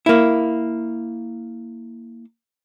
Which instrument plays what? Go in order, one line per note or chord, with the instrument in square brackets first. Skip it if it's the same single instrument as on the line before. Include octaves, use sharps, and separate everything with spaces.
[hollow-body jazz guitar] A#3 E4